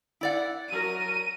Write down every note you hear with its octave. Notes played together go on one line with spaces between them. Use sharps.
E4 D5 F#5
F#3 A#4 D#7